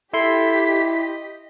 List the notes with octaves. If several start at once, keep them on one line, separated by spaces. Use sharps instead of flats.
E4 G4 A4 C6 B6
D#5